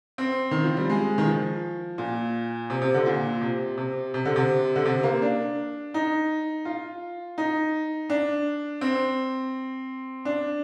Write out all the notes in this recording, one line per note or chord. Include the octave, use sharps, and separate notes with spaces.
C4
D#3
F3
G3
G#3
D#3
F3
A#2
C3
C3
D3
A#2
C3
C3
C3
D3
C3
D3
C3
A#3
D4
D#4
F4
D#4
D4
C4
D4